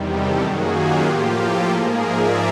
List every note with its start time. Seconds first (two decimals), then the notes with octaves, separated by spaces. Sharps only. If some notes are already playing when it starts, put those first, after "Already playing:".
Already playing: E2 C3 D#3 G3
0.09 G4 A4
0.41 F#2 D#3 F#3 A#3 F#4 G#4
0.73 F4 G4
1.06 A2 F3 A#3 F4 G4
1.38 G4 A4
1.70 G#2 F3 A#3 G#4 A#4
2.02 D5 E5